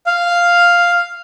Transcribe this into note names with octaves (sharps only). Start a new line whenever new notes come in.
F5